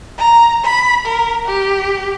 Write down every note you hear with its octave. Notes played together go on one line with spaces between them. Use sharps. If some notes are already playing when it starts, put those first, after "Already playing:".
A#5
B5
A#4
G4